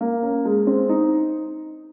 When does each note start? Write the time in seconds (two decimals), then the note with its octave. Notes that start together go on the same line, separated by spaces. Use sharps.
0.01 A#3
0.22 C#4
0.45 G#3
0.67 C4
0.89 D#4